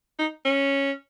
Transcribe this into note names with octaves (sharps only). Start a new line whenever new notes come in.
D#4
C#4